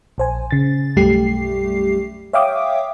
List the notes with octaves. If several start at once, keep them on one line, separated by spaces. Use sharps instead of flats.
A#1 C5 G#5
C#3 A6
B1 F#2 G3 A3 G4 C7
C#5 E5 F5 G5 D6 D#6